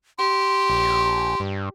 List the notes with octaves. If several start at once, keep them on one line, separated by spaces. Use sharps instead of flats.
G4 C6
A#1
G2